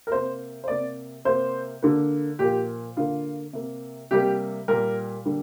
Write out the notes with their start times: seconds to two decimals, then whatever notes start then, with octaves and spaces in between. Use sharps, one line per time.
0.07 A#4
0.11 C3 A#3 C5
0.64 C5
0.68 C3 A#3 D5
1.25 C3 A#3 C5
1.83 D3 A#3
2.39 A#2 F3 A#3 G4
2.97 D3 A#3 F4
3.53 C3 A#3
4.11 C3 G3 A#3 G4
4.68 A#2 G3 A#3 A#4
5.25 D3 G3 A#3